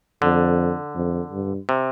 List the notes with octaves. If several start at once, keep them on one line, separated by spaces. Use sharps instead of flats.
F2 D3
F2
G2
C3